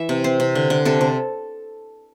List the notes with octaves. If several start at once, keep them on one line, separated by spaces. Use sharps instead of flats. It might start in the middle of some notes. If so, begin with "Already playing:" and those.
Already playing: E3 E5
C3
C4 C5
C3
D3
D3
C3 A4
C3